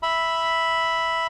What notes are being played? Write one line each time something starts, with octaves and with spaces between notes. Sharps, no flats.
E5 B5